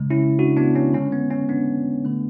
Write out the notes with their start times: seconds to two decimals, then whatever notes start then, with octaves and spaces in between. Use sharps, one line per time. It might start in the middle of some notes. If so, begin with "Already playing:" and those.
Already playing: C#3 G#3
0.10 C#4 E4
0.39 D4 F#4
0.57 B3 D4
0.76 C#4
0.93 D3 G#3 C#4
1.12 B3
1.30 C#4
1.49 B3 D4
2.05 D3 A3